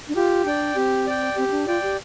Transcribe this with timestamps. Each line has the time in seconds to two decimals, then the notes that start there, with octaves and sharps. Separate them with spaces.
0.08 D4
0.15 F4 G4
0.45 D4 D5 G5
0.75 C4 G4
1.07 D5 G5
1.36 C4 G4
1.48 C4
1.51 D4
1.67 F4 D5 G5
1.83 G4